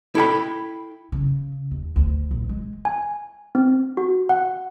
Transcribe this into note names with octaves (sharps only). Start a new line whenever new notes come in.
E4 A4 G5 B5
C#3
D#2
D2
A#1
G#3
G#5
C4
F#4
F#5